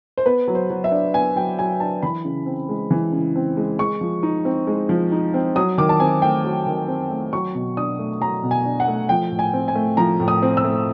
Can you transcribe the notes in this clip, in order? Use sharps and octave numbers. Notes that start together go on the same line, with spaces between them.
C5
B3 B4
F#3
C5
F#3
E5
D4
B3 G#5
F#3 G5
F#3 G#5
D4 A5
E3 B5
C#3
C4
G#3
E3
C#3
C4
G#3
G#3 C#6
F3
D#4
C4
G#3
F3
D#4
C4
F#3 D#6
D#3 D6
A5
C4 G#5
A3 G5
F#3
D#3
C4
A3
F#3 C#6
B2
D4 D#6
A3
F#3 A#5
B2
G#5
D4
F#5
A3
F3 G5
A2
G#5
C4
G#5
A3
F3 A#5
A2
D#6
C4
E6
A3